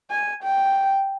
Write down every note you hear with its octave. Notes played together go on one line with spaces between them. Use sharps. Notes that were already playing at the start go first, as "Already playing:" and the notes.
G#5
G5